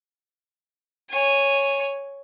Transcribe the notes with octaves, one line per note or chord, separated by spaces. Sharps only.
C#5 G#5